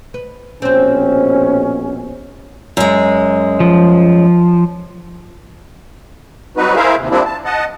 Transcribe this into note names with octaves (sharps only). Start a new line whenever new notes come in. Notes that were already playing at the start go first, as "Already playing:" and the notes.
B4
A#1 B2 C4 C#4 C5
F#2 G#3
F3
F#3 G3 C4 D#4 F#4 B4
E4 G#4 A#4 C5 E5 F5
D#2 C3
F3 G3 A#3 C4 D4 E4
A5
D#5 F#5 A5